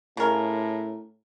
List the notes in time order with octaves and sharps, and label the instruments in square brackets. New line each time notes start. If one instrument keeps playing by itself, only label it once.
[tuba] A2 [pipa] C#3 A#4